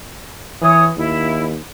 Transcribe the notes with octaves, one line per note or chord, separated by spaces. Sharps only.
E3 C#5 D#6
D#2 E4